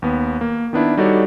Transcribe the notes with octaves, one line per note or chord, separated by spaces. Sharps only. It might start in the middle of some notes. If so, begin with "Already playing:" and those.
D#2 B3
A#3
D#3 B3 D4 E4
G3 D#4 F#4 A4 C#5 D5